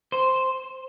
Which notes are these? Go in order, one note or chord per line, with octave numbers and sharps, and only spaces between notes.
C5